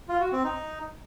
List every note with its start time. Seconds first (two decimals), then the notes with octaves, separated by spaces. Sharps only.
0.09 F4
0.20 F#4
0.32 C4
0.44 D#4